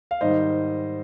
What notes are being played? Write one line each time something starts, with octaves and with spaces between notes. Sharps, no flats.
F5
G#2 D#3 G3 C5 D#5